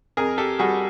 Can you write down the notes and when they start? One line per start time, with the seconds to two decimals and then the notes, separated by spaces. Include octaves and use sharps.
0.17 F2 G#4 A#4
0.38 G4 A4
0.59 G3 F#4 G#4